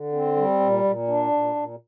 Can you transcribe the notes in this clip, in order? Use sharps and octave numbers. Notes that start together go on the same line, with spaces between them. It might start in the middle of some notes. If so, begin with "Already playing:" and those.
Already playing: D3
C4
G3
A#2
A#2
D4
A#2
A#2